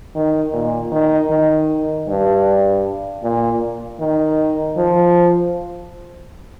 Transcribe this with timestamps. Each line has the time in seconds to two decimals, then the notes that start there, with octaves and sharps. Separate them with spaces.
0.15 D#3
0.53 A#2
0.92 D#3
1.30 D#3
2.08 G2
3.23 A#2
4.00 D#3
4.77 F3